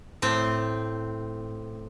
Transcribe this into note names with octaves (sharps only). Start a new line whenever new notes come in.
A2 C4